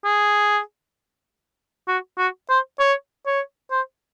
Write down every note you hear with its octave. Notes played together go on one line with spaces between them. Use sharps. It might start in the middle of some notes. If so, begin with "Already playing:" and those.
G#4
F#4
F#4
C5
C#5
C#5
C5